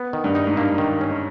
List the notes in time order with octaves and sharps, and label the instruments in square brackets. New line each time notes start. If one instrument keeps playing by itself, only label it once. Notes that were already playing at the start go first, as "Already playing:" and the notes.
Already playing: [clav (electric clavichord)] B3
D#3
[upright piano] G2
[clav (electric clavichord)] D#4
[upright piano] G#2
[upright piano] G2 [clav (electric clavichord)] A#3
[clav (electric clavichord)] D#3
C#4